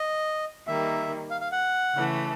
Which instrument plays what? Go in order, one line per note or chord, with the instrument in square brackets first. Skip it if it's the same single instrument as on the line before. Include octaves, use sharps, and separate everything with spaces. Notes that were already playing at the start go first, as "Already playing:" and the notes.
Already playing: [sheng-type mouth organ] D#5
[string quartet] D#3 G3 A#3 [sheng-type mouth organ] E5
[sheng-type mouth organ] F5
F5
F#5
[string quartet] C#3 E3 A3